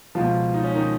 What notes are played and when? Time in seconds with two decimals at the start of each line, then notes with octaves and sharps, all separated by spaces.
0.15 C#2 B2 F3 F4
0.54 D#4
0.64 C#4
0.74 D#3 D#4